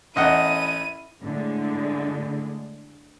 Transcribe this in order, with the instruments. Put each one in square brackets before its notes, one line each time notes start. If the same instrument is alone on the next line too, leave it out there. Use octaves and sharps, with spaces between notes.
[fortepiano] A1 D#5 F#5 [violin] E4 D#7
[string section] A2 D3 G#3